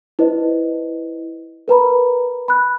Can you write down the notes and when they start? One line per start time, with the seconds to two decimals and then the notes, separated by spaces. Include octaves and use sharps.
0.19 E4 B4 C5 D#5
1.68 A#4 B4 A#5 B5
2.48 B5 F#6